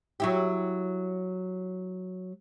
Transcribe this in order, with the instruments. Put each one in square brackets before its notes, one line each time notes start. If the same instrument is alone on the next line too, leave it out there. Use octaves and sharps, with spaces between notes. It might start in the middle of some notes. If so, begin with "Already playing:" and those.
[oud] F#3 E4 G4